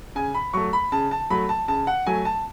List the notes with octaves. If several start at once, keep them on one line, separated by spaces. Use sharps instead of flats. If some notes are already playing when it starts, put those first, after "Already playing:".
C#3 G#5
B5
F#3 A3 C#6
B5
C#3 A5
A5
F#3 A3 B5
A5
C#3 A5
F#5
F#3 A3 G#5
A5